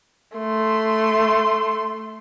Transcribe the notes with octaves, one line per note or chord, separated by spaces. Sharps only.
A3 C6